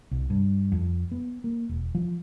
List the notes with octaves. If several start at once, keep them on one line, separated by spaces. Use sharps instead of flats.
C2
G2
F2
B3
A#3
E1
F3